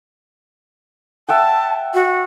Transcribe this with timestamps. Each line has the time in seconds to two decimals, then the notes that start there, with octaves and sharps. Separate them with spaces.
1.29 E5 F#5 G5 A5
1.94 F#4